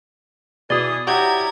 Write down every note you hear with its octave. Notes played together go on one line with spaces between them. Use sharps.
B2 E3 G#4 D5 D#6
F#3 E4 F#4 G4 A#5 G#6